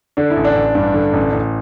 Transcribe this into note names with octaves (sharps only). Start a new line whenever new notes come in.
D3 D4
E4
A1
D4
A1
G2
D3
A1
A1